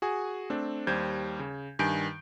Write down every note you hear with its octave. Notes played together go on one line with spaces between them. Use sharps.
F#4 G#4 G#5
A3 C4 D4
D#2 G3 C5 G6 G#6
C#3
G2 D#3 G#5 G6 D7